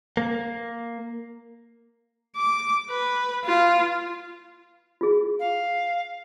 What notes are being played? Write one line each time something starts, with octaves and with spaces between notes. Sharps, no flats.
A#3
D6
B4
F4
F4 G#4
F5